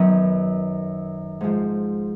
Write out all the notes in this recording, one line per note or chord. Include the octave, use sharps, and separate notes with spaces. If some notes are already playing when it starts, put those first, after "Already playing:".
Already playing: F#2 D#3 F#3 B3
G#2 F3 G#3